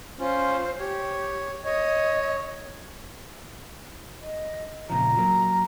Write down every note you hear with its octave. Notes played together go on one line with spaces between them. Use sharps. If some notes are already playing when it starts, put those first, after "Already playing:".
C#4 F4 C5
G4 C#5
C#5 D#5
D#5
A#2 C#3 F3 A#5
F#3 A#3